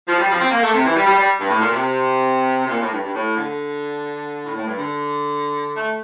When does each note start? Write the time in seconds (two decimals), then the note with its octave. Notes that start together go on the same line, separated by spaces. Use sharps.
0.07 F3
0.18 G3
0.29 F3
0.40 C4
0.51 A#3
0.62 A3
0.73 C3
0.84 E3
0.95 G3
1.06 G3
1.16 G3
1.39 G2
1.49 A2
1.60 A#2
1.71 C3
2.65 C3
2.70 A#2
2.80 A2
2.91 G2
3.02 G2
3.13 A2
3.35 D3
4.44 A2
4.55 A2
4.66 G2
4.77 D3
5.74 A3